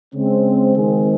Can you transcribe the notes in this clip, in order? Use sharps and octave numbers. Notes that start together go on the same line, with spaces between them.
C#3 G#3 C4
D#3 G#3 C4 G#4